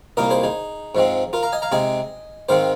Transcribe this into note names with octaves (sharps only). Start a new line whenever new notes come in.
C2 A#2 A#3 D#4 A#4 D#5
G#4 C5
D#4 G#4
G#2 F3 G#3 C4
F4 A#4
F5 A#5
D#5 G#5
F5 A#5
C3 G#3 C4 D#4 D#5 G#5
G#2 D#3 G#3 C4 C5 F5